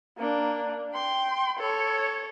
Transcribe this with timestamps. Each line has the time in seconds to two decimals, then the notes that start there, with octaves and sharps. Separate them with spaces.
0.18 A#3 D4
0.94 G5 C6
1.59 A4 C#5